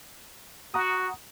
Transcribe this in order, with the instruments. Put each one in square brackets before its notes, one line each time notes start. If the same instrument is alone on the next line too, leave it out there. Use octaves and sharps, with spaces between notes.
[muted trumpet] F#4 [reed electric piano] F#5 A#5 D#6